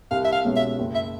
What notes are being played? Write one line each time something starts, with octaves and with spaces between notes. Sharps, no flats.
C2 F5
E5
F5
B2 G#3 C#4
E5
F#1
E5